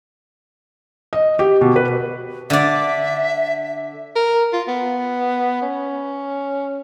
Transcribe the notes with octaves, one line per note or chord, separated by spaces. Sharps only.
D#5
G4
B2
B4
D3 D5 E5
A#4
F4
B3
C#4